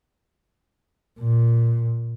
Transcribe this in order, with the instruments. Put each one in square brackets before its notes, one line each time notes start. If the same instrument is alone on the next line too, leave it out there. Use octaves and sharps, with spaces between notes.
[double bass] A#2